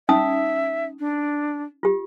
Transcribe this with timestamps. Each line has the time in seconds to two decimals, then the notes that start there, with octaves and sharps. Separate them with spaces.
0.09 C#4 D#4 E5 D#6
1.00 D4
1.83 F4 G4